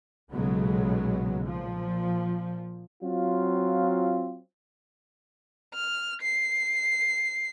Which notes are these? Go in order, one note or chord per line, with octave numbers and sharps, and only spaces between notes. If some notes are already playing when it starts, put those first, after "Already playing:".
B1 A#2 C#3 F#3 G#3 B3
A#2 F3
F#3 C4 F4
F6
C7